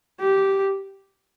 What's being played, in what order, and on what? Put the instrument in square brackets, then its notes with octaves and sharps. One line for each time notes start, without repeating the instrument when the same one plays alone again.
[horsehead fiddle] G4